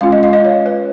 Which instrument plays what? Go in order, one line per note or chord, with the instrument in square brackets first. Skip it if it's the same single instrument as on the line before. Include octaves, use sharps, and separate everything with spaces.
[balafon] G#3 C#4 F4 F5
D#5
F5
D#5
C#5
B4